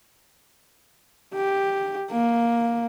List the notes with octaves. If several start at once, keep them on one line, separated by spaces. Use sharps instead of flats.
G4
A#3